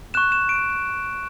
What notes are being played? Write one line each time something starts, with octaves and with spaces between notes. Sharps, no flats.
C#6 F#6 E7
E7
D7